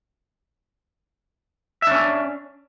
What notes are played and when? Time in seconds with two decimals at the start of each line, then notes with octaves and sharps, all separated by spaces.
1.82 E5
1.87 D4
1.92 C#4